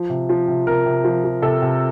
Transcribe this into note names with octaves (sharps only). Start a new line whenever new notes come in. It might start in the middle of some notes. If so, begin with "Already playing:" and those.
Already playing: F3
C3
F3
C3
C3 A#4
C3
F3
F3
C3 A4
C3